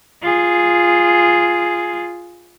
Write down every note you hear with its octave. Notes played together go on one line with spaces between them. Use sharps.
F4 G#4